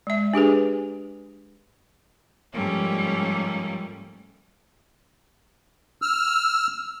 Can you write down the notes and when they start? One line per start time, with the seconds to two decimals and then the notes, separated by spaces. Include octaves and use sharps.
0.07 G#3 E5
0.34 D4 G4 G#4 B4
2.53 G#2 F3 G3 A3 A#3 C#4
6.02 E6 F6